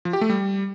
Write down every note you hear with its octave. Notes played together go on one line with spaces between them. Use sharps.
F3
G4
A3
G3